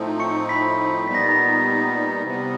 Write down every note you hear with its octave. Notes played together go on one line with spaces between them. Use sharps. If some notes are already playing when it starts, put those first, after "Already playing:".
Already playing: A2 F3 A3 C4 D#4
C#6 C#7
B5 B6
A#2 G3 B3 D#4 B6
A#6
A6
A#5 A#6
C3 E3 G3 B3